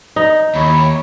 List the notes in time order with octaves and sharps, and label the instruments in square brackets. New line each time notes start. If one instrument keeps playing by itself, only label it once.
[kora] D#4
[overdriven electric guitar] D#2 [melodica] E4 [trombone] C#5